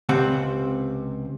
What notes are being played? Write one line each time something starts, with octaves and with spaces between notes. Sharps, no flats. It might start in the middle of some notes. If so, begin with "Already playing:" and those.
C#2 C3 C4 F#5